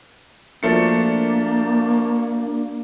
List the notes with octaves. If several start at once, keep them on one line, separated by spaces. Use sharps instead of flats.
F3 A3 A#3 D4 F#4 A#4 D5 C#7